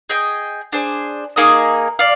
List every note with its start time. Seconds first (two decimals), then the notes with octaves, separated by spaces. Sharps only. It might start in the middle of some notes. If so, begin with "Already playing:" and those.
0.10 G#4 D#5 G5
0.73 D4 G#4 C5
1.36 A#3 D#4 G#4 D#5
1.99 D5 F5